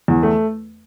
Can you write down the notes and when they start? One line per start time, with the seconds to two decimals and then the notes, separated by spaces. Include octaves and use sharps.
0.08 E2
0.23 A3